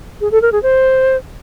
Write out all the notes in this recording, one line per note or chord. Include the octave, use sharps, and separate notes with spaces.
G#4
A4
A#4
G#4
C5